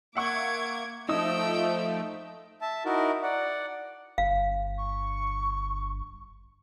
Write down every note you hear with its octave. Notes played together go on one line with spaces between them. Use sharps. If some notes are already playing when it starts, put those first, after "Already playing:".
A#3 E5 F#5 C#6 D6 G#6
F3 A3 D#4 G5 D#6 E6
E5 A5
D#4 E4 F#4 A#4
D5 F#5
G1 F5
C#6